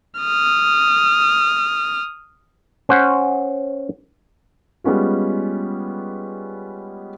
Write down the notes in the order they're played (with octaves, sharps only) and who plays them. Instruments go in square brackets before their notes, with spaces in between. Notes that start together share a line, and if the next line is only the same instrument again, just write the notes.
[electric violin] D#6 F6
[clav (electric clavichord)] C#4 C5 F#5
[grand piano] G3 G#3 B3 C#4 F4